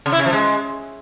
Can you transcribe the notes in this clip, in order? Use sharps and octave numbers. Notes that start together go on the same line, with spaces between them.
C#3
E4
C#3
F3
G#3